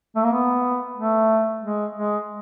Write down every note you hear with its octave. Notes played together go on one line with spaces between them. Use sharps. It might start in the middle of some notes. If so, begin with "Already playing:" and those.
A3
A#3
B3
A3
G#3
G#3